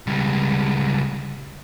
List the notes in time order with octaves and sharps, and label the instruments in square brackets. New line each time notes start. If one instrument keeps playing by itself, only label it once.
[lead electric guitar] C#2 G3